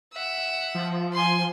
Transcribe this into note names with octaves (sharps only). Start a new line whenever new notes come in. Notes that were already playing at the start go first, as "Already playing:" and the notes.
E5 F#5
F3
G#5 C6